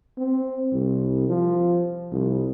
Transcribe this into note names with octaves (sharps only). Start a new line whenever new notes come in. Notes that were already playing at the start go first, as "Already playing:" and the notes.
C4
C2
F3
C2